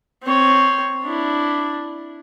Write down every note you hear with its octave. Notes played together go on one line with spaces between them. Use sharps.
C4 C#5
D4 E4